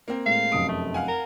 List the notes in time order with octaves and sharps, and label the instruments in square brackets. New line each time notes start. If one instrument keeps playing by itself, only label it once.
[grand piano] A#3 C4
[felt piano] A2 G#3 [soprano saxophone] F5
[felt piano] F1 F#2 D7 [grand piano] D#6
[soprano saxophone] A3
[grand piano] F5 F#5 G#5
[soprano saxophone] A#4